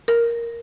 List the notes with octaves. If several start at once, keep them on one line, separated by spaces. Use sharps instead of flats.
A#4